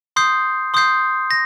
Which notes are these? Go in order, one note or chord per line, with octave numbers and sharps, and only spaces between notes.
C6 D#6 G6 C7
C6 D#6 G6 C7
A#6